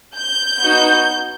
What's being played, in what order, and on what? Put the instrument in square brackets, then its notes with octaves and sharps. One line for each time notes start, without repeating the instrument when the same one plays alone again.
[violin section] G6
B3 D#4 F#4